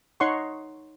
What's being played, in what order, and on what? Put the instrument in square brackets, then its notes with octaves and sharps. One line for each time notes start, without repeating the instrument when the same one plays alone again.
[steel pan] D#4 C#5 F#5 C6 C#6